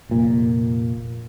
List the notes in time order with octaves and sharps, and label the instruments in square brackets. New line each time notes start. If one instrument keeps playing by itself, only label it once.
[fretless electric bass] F1 A#2